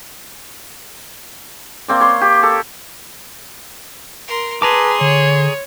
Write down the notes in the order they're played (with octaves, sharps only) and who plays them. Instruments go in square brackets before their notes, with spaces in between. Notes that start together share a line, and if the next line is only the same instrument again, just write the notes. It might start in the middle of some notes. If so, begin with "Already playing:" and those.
[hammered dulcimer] A#3 C4 D5
C#5 C6
G4
A4
[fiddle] A#4 C6
[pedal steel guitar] G#4 A#5 D6 [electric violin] B4 [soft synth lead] A5 [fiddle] C6
[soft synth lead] D3 [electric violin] C#5